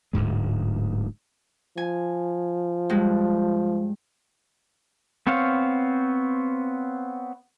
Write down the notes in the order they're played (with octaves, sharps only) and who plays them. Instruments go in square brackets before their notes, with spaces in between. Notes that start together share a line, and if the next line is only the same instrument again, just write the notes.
[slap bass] D1 D2 G#2 G#3
[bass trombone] F3 [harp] G#5
[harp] G2 G#3
[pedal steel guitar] B3 C4 C5 C#5 F5